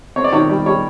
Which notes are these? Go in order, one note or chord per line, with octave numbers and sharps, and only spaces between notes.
C4 C#5
D5
D#3 C#5
G3
G3 C#5